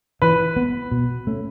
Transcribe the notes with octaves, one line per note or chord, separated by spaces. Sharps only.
E3 B4
B3
B2
A3 C#4